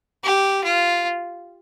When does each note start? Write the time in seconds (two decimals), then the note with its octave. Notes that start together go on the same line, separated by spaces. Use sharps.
0.24 G4
0.64 F4